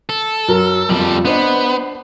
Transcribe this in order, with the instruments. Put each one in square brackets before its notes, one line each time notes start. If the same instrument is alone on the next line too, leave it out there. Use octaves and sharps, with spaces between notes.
[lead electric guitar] A4
[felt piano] F#2 F#3 A#4
[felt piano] F2 F3 [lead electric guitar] G3 A4
[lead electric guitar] B3 [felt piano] D4 C5 D#5